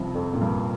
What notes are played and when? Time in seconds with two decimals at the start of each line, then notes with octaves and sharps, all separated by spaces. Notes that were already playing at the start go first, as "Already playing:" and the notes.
Already playing: G2 C3 F3
0.14 F2
0.33 A#2
0.41 G2